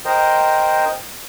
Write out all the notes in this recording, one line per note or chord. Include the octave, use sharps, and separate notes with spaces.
A#4 C5 D#5 G5